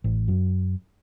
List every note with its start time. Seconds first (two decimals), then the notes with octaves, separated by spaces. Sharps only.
0.04 A1
0.28 F#2